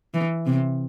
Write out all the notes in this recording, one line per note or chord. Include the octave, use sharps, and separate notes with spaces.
E3
C3